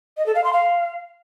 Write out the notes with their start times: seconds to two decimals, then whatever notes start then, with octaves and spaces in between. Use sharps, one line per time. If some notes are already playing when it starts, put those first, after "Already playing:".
0.17 D#5
0.26 A4
0.35 F5
0.44 C6
0.53 F5